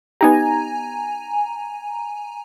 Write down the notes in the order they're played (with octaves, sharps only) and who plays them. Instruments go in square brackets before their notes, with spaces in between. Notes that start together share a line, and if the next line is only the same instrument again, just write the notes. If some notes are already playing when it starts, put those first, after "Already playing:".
[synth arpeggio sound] B3 D#4 G4 [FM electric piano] G#5 A#5